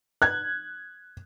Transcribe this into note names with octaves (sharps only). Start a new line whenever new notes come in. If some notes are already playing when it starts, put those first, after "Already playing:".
F#6 G#6